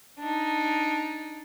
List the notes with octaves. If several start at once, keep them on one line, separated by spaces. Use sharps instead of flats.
D4 D#4